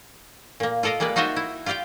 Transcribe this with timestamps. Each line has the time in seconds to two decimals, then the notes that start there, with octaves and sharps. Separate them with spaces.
0.60 A#2 A#3
0.83 F4 A4 D5 D#5 F5
1.00 G3 G#3 A#3 B4 D5
1.16 D#4 F4 F#4 C5 D#5 E5
1.36 E4
1.66 F4 G4 D5 F5 G5